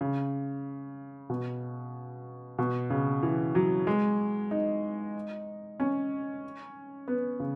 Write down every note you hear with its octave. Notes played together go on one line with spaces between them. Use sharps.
C#3
B2
B2
C#3
E3
F#3
G#3
D#4
C#4
B3
C#3